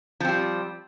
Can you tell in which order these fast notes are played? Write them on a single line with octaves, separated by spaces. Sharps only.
F3 C4 G3